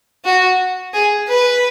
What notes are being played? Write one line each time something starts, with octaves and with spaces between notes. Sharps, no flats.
F#4
G#4
B4